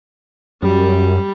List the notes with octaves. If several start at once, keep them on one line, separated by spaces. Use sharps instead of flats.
F#2 G3